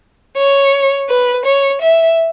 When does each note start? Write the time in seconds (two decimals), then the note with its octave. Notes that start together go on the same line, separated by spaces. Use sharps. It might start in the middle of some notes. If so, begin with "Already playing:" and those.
0.37 C#5
1.09 B4
1.45 C#5
1.82 E5